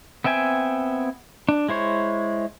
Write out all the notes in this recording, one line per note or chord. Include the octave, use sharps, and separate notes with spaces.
B3 C4 E5 G5 G#5
D4
G#3 E4 C5 C#5